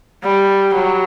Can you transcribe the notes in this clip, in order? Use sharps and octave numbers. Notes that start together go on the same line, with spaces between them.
G3
F#3